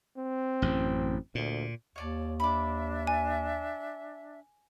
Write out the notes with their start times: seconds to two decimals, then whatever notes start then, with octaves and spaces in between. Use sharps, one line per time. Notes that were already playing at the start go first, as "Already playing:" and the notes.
0.17 C4
0.62 A1 F#2
1.35 D2 A#2
1.96 D#2 C#5 D5 A5
2.40 D4 E5 B5 D6
3.07 G#5